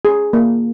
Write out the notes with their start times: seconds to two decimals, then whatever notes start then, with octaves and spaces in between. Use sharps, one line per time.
0.05 G#4
0.33 A#3